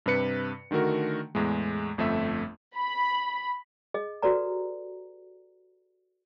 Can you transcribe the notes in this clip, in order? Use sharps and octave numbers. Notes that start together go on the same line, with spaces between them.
G2 C3 B4 C#7
D3 D#3 A3 F#4 A#4
E2 A2 G#3
G1 F2 A3 E5
B5
G#4 D#5
F#4 G4 A4 B4 D5 A#5